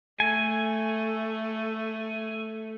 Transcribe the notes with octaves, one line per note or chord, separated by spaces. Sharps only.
A3 G#5